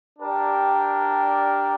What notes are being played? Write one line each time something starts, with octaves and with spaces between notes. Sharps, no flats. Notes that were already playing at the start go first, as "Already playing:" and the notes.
D4 G4 A#4 D5 G5